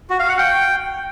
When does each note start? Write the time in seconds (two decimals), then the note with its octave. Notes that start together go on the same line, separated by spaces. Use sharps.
0.10 F#4
0.19 F5
0.29 F#5
0.39 G5